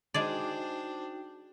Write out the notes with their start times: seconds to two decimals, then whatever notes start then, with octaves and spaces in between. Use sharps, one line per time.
0.14 G#3 D4 D#4 F#4 G#4 C5 D5 G5